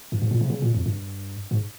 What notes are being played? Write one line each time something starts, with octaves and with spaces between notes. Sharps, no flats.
G2
G#2
A#2
C3
C#3
A#2
F2
G2
G#2